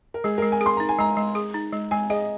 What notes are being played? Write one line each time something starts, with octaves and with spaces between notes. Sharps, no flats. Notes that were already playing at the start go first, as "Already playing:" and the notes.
A#4
G#3 G#4
G#3 A#4
G#5
G#4
C6
D#4 A#5
G#5
G#3 A#5
G#3
G#4
D#4
G#3
G#3 G#5
G#4 D#5